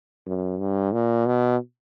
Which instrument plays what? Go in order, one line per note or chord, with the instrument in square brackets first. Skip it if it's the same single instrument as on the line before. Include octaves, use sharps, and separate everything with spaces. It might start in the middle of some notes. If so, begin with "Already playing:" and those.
[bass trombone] F#2
G2
A#2
B2